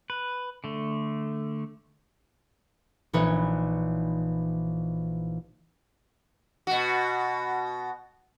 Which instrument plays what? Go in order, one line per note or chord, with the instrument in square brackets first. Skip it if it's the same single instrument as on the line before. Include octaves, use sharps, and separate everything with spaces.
[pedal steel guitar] B4
D3 A3
[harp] A#1 E3 D#4 B4 C#5
[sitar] B2 F#4